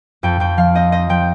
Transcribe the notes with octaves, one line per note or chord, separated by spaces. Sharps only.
F2 G5
F2 G5
F3 F5
C4 D#5
C4 D#5
F3 G5